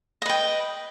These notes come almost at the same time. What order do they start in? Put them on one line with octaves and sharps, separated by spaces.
D#5 B4 G5